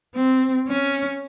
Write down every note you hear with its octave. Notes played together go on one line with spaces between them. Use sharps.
C4
C#4